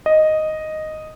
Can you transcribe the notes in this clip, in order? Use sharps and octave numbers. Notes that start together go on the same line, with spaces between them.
D#5